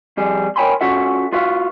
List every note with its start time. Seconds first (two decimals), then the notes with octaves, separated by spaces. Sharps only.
0.17 F2 G3 G#4
0.56 A#4 C#5 G5 G#5 B5 C6
0.81 C#4 F4 F#4 A4 E5 F#5
1.33 F4 F#4 B4 E5 F5